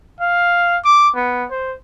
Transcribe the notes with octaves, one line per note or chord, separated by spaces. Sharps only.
F5
D6
B3
C5